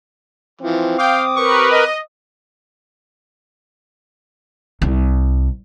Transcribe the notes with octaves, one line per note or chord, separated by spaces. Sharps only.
E3 F3 C4
F5 G5 D6 D#6
G4 A#4 B4 C#6
D#5
C2